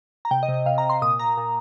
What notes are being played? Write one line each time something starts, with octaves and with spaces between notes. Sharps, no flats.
A#5
C3 G5
D#5
C3
D#5
C3 F5
A#5
C3
C6
A#2 D#6
A#2 A#5
A#2